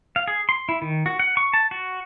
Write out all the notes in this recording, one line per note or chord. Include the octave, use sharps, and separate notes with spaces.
F5
G#4
C6
E4
D#3
F#4
F#5
C#6
A5
F#4